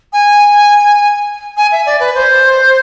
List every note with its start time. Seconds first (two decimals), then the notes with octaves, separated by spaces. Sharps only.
0.13 G#5
1.57 G#5
1.72 E5
1.86 D5
2.00 B4
2.15 C5